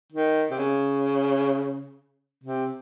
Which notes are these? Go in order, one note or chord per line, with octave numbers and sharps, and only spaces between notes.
D#3
C3
C#3
C3